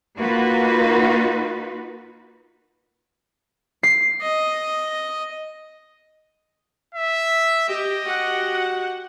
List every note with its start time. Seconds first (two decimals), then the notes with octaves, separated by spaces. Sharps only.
0.17 A#3 D#4 F4 F#4 B4
3.83 C7
4.22 D#5
6.94 E5
7.69 G4 D#5
8.05 F#4 G4 F#5